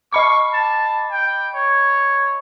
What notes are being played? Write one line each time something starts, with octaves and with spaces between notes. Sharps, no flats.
D#5 B5 C#6 D6
A5
G5
C#5